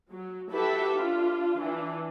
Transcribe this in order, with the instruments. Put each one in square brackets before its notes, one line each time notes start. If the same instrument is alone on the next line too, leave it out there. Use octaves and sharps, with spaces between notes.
[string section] F#3
E4 F#4 G4 A4 B4 E5
D4 F4
E3 D4